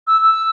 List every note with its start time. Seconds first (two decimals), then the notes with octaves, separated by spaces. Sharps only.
0.07 E6
0.22 E6